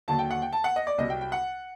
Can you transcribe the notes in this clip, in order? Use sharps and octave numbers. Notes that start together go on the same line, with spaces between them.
D#2 D3 F#3 A5
G5
F#5
G5
A5
F#5
D#5
D5
C2 C3 F#3 D#5
G5
G5
F#5